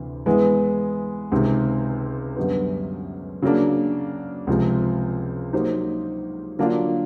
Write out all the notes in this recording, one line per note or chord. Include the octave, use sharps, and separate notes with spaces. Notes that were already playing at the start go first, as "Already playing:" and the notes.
Already playing: D2 C3 E3
E3 G#3 B3
C#2 C3 D#3
F#2 D3 G3 B3
C#3 F#3 A#3 D4
C#2 C3 F3
F#3 A#3 D#4 G4 C5
D3 F#3 A#3 D4 F4